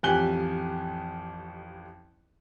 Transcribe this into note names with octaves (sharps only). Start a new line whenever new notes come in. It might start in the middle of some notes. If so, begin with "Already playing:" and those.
A1 F2 G4 G#5 F#6 G7